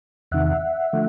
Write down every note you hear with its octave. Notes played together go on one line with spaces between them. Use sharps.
E2 C3 D#3 E5 F#5
D3 F3 A3